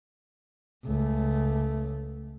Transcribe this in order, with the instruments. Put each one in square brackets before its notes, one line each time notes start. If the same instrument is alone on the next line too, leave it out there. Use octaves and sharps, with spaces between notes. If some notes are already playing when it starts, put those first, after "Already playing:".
[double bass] C#2 A3